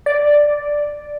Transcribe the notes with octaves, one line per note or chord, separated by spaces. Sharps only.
D5